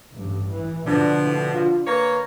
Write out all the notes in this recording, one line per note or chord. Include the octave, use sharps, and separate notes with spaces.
A1 G2
E3
B2 D3 F3 D4
A2
F4
A#3 B4 C#5